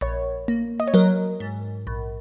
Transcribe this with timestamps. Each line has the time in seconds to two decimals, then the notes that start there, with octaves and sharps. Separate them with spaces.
0.01 A#1 C#5
0.48 A#3
0.80 D#5
0.88 C#5
0.94 F#3 A#4
1.40 G#2
1.87 A#1